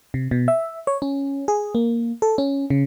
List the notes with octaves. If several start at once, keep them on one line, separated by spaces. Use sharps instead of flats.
C3
B2
E5
C#5
C#4
G#4
A#3
A4
C#4
C#3